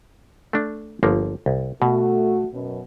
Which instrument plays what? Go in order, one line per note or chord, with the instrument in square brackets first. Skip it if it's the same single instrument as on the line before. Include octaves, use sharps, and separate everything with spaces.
[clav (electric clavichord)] A3 D4
G1 F3 A#3
C2
[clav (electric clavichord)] B2 [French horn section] A3 F#4
[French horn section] F#2 B2